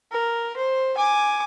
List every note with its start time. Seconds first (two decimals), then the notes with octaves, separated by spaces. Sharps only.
0.12 A#4
0.56 C5
0.97 G#5 D6